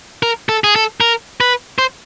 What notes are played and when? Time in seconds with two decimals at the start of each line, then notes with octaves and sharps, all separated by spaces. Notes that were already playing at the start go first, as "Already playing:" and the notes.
0.23 A#4
0.49 A4
0.64 G#4
0.76 A4
1.01 A#4
1.41 B4
1.78 C5